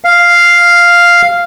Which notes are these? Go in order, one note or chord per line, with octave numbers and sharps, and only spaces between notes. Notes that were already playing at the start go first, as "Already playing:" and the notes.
F5